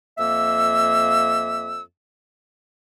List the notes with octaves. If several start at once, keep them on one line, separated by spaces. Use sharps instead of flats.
F2 A#3 E5 E6